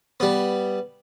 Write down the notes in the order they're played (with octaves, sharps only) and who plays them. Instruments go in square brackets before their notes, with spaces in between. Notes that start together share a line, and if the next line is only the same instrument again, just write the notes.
[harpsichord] G3 B3